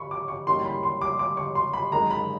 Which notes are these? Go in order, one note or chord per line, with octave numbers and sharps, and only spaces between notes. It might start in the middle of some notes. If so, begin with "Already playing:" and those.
Already playing: B5 C#6
D6
C#6
G#2 E3 G3 A#3 C#4 C6
B5
C6
D6
D6
C#6
C6
B5
F#2 D#3 G#3 A#5
B5